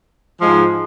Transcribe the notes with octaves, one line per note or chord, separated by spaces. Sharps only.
G#2 F3 G#3